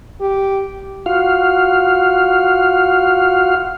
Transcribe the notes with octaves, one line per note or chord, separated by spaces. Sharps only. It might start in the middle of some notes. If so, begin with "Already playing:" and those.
G4
F4 F#4 F5